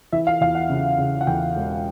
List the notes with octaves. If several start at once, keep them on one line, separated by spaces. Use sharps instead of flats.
E3 E5
F5
E2 F5
F#5
C#3
C#3
F#5
E2 G5
E1